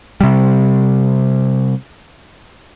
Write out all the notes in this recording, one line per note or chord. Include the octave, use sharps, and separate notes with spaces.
C3 G3